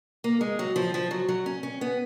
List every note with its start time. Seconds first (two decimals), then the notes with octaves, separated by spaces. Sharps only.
0.24 A#3
0.41 G#3
0.59 F#3
0.76 F3
0.94 F3
1.11 F#3
1.29 F#3
1.46 C#4
1.63 C#4
1.81 B3